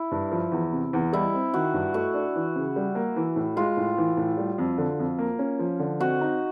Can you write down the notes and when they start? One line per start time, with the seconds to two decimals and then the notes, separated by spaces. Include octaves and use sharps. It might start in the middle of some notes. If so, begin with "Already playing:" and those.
Already playing: E4
0.11 G2
0.31 F3
0.52 E2
0.72 C3
0.93 E2
1.13 G3 E4
1.34 C4
1.54 D#3 F#4
1.74 G2
1.94 A3 F#4
2.14 D4
2.35 E3
2.56 C#3
2.76 G3
2.95 A#3
3.16 E3
3.36 A2
3.56 G#3 F4
3.77 A2
3.98 E3
4.17 A2
4.37 G3
4.58 F2
4.78 D3
4.99 F2
5.19 A#3
5.39 C#4
5.59 F3
5.79 D3
6.00 C4 F#4
6.21 D#4